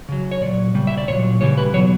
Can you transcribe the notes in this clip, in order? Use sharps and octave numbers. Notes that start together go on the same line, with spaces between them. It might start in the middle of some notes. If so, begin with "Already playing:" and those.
C#3 F#3
C#5
A#2 F#3 D5
C#3 G3
E5
D5
A#2 F#3 C#5
C#3 E3 G3 C#5
B4
B2 F#3 C#5